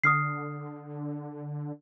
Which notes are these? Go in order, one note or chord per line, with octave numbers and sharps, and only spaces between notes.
D3 D#6 F6 C7